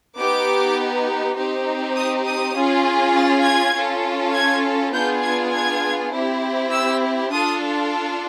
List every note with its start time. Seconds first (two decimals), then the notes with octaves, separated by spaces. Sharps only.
0.17 B3 D#4 G4 D6
1.37 C4 D#4 G4
1.96 D#6
2.26 D#6
2.55 C#4 F4 G#4
3.16 A6
3.45 G#6
3.75 C#4 F4 A4
4.33 G#6
4.93 B3 D4 F4 G#4 G6
5.23 G#6
5.53 G#6
6.13 C4 E4 G4
6.71 E6
7.31 D4 F4 A4 D#6